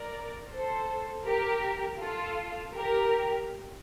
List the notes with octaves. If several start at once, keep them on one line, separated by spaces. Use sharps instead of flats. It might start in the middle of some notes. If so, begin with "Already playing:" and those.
Already playing: A#4 D5
A4 C5
G4 A#4
F4 A4
G4 A#4